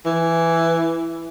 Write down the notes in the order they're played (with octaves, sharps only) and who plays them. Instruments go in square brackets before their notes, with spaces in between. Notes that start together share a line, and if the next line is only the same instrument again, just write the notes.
[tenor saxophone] E3